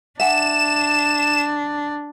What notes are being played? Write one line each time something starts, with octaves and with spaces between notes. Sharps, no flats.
D4 E5 F#5 G#5 E7